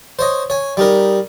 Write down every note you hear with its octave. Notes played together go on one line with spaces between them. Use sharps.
C5 C#5 D#5
C#5 G#5
G3 D#4 A#4